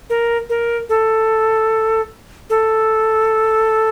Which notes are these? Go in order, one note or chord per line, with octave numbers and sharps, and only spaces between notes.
A#4
A#4
A4
A4